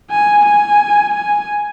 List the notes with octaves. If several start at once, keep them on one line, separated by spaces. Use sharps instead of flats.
G#5
G#5
G#5